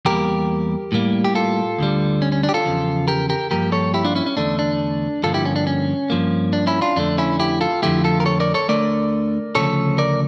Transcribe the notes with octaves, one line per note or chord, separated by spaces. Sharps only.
E2 E3 G3 A#3 G4 A#4
A2 G3 A#3
G4
F4 A4
D2 D3 G3
C#4
C#4
D4
G4
F4 A4
E2 C#3 F3
G4 A#4
G4 A#4
G2 F3 A#3 G4 A#4
A4 C#5
E4 G4
D4 F4
C#4 E4
C#4
E2 D3 A3 D4
D4
G2 D3 F3 A#3 F4 A4
E4 G4
C#4
D4
C#4
G2 F3 A#3
D4
C#4 E4
D4 F4
F2 D3 A3 D4
C#4 E4
E4 G4
F4 A4
F2 D3 F3 A3 E4 G4
F4 A4
A#4
A4 C#5
A#4 D5
A4 C#5
D2 D3 A3 A#4 D5
D2 C#3 F3 A3 A4 C#5
A#4 D5